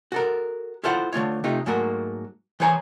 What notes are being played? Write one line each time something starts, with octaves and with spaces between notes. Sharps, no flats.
F#4 A4 A#4
E4 F4 A4 C5 F5 F#5
D3 A3 F4 C#5
C3 A3 D#4 F4
G#2 F#3 A3 A#3 F#4 A#4
E3 G#4 C5 C#5 G#5 A#5